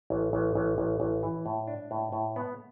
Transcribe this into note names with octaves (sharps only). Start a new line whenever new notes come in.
A1
A1
A1
A1
A1
E3
A2
D4
A2
A2
B3